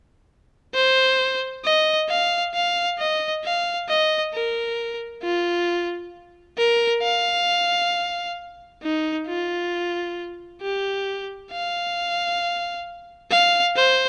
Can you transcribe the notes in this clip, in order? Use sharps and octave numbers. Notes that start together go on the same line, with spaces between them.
C5
D#5
F5
F5
D#5
F5
D#5
A#4
F4
A#4
F5
D#4
F4
G4
F5
F5
C5